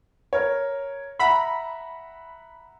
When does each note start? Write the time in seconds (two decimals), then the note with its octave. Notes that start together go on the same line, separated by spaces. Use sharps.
0.33 A#4 C#5
1.19 E5 F#5 A#5 B5